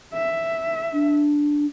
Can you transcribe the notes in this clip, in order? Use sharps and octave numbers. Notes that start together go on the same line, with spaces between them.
E5
D4